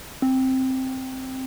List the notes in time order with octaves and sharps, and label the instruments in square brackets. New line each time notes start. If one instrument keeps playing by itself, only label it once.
[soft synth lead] C4